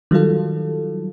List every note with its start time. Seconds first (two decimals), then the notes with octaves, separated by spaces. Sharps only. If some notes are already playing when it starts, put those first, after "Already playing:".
0.11 D#3 F#3 G3 F4 A4